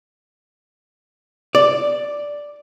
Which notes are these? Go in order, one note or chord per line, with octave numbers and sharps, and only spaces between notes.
D5